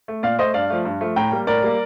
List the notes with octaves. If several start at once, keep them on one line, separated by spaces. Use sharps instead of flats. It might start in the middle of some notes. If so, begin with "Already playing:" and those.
A3
A#2 D5 F5
A3 C5 D#5
G2 D5 F5
F3 A3
G2
F3 A3
A2 G5 A#5
G3 A#3
A2 A#4 D5
G3 A#3